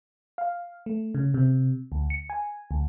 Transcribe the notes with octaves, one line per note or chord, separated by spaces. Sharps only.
F5
A3
C#3
C3
D2
C#7
G#5
D2